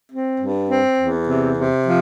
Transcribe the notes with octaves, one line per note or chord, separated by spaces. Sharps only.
C4
G2
C4
E2
C3
C3
F3